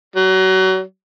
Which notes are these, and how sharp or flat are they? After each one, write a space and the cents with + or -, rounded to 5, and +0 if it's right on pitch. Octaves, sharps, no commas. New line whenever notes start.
F#3 +30